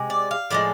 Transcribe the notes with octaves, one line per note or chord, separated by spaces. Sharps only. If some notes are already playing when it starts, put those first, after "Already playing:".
Already playing: C3 G#3
D5
F5
A2 F3 G#3 D5